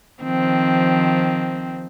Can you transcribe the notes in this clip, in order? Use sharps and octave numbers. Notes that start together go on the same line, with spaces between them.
D#3 F3 C4